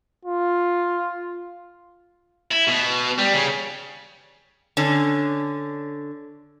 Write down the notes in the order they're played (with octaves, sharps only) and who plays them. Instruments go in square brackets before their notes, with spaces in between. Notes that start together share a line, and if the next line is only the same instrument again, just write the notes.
[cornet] F4
[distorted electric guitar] E4
B2
G3
C#3
[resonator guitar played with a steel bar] D3 C#4